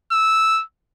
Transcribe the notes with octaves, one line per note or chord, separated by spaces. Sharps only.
E6